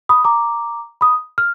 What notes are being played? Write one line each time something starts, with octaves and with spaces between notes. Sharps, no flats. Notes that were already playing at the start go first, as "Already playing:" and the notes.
B5 D#6
A#5 D6
B5 D#6
F6